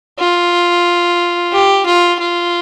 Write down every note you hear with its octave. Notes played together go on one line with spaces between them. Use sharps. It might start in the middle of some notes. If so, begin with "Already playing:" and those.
F4
G4
F4
F4